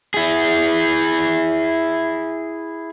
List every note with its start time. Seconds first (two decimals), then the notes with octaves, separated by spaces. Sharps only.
0.14 E4 G#4